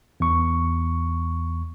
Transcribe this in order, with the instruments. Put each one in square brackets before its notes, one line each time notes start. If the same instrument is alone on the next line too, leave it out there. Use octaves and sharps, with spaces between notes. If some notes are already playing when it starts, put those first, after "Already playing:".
[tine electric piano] E2 C#6